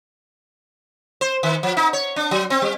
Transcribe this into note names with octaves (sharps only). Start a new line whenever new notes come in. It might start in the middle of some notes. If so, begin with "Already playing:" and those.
C5
D#3
F3
D#4
C#5
D4
F#3
C4
G3